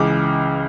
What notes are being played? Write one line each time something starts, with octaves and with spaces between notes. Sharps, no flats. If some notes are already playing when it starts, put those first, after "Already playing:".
Already playing: C#2 C#3 E3 G#3 D6